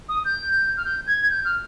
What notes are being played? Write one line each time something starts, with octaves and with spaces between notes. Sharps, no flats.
D#6
G6
F6
G6
G#6
G6
F6